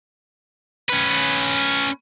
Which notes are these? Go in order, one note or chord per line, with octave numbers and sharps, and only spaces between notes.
C#4 B4